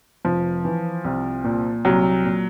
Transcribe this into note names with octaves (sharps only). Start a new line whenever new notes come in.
F1 F3
E3
C2
A#2
C2 F#3
A#2